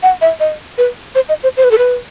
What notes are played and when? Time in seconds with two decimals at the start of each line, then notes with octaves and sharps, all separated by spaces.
0.03 F#5
0.22 E5
0.40 D#5
0.78 B4
1.15 C5
1.29 D#5
1.43 C5
1.57 C5
1.64 B4
1.71 A4
1.78 B4